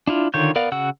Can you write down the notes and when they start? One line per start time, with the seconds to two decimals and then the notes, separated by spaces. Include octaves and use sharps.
0.07 D4 E4 F4
0.34 D3 D#3 F4 C#5 G6
0.56 B3 A#4 D5 F5
0.72 C#3 F#4 F#5 E6